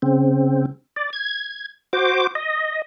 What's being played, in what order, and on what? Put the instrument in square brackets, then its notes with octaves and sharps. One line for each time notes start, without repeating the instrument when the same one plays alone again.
[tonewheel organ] C#3 C4
D5
G#6
F#4 C5 D6
D#5